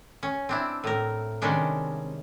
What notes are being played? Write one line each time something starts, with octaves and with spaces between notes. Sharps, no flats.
C#4
C4 D4 E4
A2 A#4
C3 D#3 G3 G#3 C#4 D4